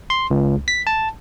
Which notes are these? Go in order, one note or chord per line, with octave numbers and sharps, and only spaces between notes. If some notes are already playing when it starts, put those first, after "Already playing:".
C6
C#2
B6
A5